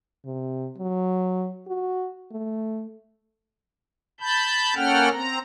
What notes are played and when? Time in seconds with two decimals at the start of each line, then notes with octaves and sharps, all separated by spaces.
0.25 C3
0.78 F#3
1.67 F#4
2.31 A3
4.20 A5 B5 G6
4.75 A#3 C#4 A4 F#5 G5 F6
5.13 C4 A#5